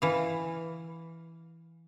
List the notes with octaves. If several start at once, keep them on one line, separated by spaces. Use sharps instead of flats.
E3 F5